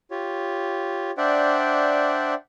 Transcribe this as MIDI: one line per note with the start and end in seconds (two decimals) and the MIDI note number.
0.11 1.11 65
0.11 1.11 67
0.11 1.11 73
1.17 2.34 62
1.17 2.34 72
1.17 2.34 74
1.17 2.34 76
1.17 2.34 78
1.17 2.34 79